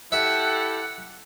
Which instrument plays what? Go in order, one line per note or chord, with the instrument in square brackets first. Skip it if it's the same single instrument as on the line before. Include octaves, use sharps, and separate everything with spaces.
[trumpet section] E4 G4 A4 [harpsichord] E5 [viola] F#5